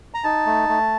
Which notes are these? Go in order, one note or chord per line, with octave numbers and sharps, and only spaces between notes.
A#5
D#4 A5
A3
A3